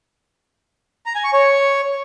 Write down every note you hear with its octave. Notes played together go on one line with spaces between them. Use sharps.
A#5
G#5
C#6
C#5